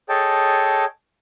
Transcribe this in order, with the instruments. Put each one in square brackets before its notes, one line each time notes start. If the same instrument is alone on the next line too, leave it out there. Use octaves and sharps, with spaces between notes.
[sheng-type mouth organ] G#4 A4 C#5 D#5 G5 A5